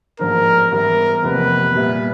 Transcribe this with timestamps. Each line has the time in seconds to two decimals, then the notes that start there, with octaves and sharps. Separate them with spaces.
0.19 A1 G#2 F3 A#3 D4 A#4
0.71 G#2 E3 G3 B3 A#4
1.23 F1 E2 C3 F3 A#3 B4
1.75 A#2 G3 B3 E4